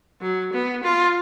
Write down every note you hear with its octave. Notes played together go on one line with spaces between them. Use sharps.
F#3
B3
F4